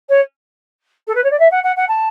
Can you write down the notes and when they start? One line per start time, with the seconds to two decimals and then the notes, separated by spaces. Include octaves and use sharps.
0.09 C#5
1.07 A4
1.15 B4
1.24 C#5
1.31 D5
1.40 E5
1.51 F#5
1.64 F#5
1.76 F#5
1.88 A5